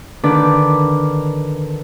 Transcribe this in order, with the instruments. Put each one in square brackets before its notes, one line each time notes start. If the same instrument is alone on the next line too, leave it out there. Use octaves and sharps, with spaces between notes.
[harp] D3 D#3 D4 B4 D6